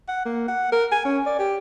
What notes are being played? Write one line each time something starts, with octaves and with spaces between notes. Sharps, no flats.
F#5
A#3
F#5
A#4
G#5
C#4
D5
G4